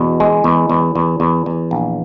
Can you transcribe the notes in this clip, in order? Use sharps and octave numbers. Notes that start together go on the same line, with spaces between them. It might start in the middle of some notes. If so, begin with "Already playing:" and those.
Already playing: E2 B2
G#3
E2
E2
E2
E2
E2
A#1